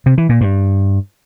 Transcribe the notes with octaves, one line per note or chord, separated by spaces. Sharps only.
C3
E3
A#2
G2